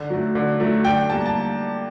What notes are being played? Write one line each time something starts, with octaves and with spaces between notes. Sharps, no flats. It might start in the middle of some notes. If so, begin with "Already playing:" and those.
Already playing: D3
F#3 A3
D3
F#3 A3
D3 G5
G3 A#3 A5
A5